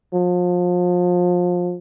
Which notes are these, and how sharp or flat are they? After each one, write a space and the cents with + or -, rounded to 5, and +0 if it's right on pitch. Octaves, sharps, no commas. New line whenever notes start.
F3 +30